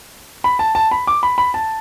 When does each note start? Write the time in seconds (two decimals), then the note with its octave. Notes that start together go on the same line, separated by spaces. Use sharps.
0.44 B5
0.59 A5
0.75 A5
0.91 B5
1.07 D6
1.23 B5
1.38 B5
1.54 A5